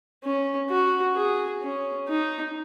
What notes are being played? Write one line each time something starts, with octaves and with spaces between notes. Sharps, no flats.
C#4
F#4
G#4
C#4
D#4